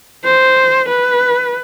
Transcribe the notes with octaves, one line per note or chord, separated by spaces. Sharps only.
C5
B4